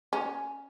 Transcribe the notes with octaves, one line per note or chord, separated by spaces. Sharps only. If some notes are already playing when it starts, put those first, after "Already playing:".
C#4